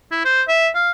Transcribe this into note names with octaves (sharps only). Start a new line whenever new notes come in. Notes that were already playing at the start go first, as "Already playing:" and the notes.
E4
C5
E5
F5